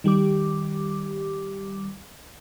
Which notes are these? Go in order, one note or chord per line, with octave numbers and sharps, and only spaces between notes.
D#3 G3 G4 D6